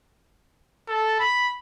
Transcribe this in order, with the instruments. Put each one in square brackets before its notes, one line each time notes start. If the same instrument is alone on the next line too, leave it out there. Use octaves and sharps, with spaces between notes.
[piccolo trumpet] A4
B5